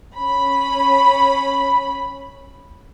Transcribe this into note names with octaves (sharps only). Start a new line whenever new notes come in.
C#4 B5